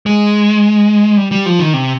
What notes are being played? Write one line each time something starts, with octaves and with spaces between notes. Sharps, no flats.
G#3
G3
G3
F3
D#3
C3